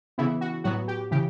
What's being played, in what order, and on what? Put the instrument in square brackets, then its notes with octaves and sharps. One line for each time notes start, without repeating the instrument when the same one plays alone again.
[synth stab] C#3 E3 B3 E4
F#4
A2 F#3 B3 F#4
G4
C#3 E3 G4